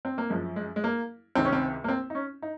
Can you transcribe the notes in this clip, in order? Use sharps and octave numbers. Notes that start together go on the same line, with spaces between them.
C4
A#3
F#2 F3 G#3
G#3
G#3
A#3
C#2 C3 D#3 C4
C#4
C4
A#3
C4
D#4
C#4
D#4